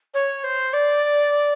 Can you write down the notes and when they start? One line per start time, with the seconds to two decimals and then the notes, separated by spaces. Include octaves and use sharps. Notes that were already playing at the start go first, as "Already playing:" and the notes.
0.14 C#5
0.44 C5
0.73 D5